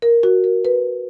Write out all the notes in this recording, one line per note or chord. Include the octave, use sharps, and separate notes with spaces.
A#4
F#4
A#4
B4